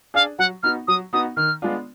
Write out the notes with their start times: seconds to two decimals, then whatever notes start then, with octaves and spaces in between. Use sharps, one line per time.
0.14 D4 G#4 F5
0.39 F#3 F#5
0.63 B3 D#4 F#4 F6
0.88 F#3 D#6
1.13 B3 D#4 F#4 D#6
1.37 D#3 F6
1.62 G#3 B3 D4 F4